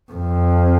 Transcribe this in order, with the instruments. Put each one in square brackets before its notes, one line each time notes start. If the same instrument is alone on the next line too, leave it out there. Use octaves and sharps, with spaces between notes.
[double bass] F2